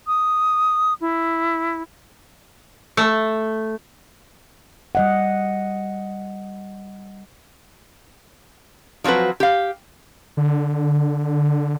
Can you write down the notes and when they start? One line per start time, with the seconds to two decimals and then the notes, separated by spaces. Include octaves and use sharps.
0.07 D#6
1.01 E4
2.97 A3
4.95 G3 D#5 F#5
9.04 F3 F#3 C4 F#4 B4
9.40 G4 F5
10.37 D3